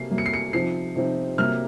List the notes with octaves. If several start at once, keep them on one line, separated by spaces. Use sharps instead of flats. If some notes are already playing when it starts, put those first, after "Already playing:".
Already playing: C3 F#3 A#3 C7
C3 F#3 A#3
C#7
C7
C#7
C3 F3 C4 D#4 C7
C3 F3 C4 D#4
C3 F#3 A#3 F6